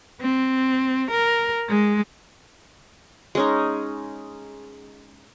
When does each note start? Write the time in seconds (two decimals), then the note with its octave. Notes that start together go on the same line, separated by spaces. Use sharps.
0.21 C4
1.11 A#4
1.69 G#3
3.35 G#3 C#4 D#4